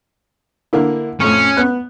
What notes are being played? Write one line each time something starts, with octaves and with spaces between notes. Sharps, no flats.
D3 A#3 E4
F2 A2 C#4
B3 F#6